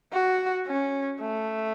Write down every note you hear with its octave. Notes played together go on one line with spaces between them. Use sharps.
F#4
C#4
A3